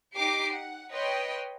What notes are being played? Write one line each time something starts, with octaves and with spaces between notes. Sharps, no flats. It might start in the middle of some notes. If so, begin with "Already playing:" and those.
D#4 G4 D6 C7 D7
F#5
B4 C#5 D#5 G5 C6